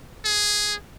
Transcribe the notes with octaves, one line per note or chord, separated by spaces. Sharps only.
G#4